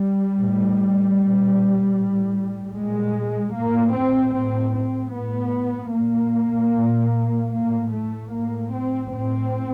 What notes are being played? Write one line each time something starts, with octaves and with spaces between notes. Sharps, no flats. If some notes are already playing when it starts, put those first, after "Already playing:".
Already playing: G3
A2
A#2
A2
A#2 G#3
A2 A#3
C4
A2 C4
C4
A2 B3
A#2 A#3
A#2
A2 A#3
A3
A2 A#3
C4
A2 C4